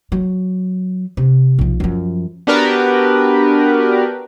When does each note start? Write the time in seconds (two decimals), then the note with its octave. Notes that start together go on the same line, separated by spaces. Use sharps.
0.12 F#3
1.17 C3
1.59 B1 F3
1.80 F#2 F3
2.47 B3 D4 F#4 G4 A#4 B4